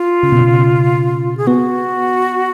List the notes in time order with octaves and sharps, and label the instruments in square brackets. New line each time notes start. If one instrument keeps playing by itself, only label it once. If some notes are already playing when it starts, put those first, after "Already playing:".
Already playing: [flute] F4
[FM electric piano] C#3
B2
C#3
[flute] G#4
[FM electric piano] B3 [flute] F#4